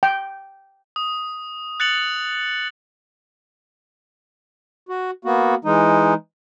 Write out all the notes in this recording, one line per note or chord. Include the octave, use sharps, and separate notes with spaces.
G5
D#6
F#6 A6 C#7 F7 F#7
F#4
A#3 B3 F#4
E3 G#3 D#4